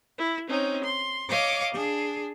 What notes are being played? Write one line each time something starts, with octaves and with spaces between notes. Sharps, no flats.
E4
C4 C#4 D#4
C6
C#5 D#5 F5 D6
D4 G#4